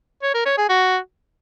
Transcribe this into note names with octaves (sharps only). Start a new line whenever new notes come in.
C#5
A#4
C#5
G#4
F#4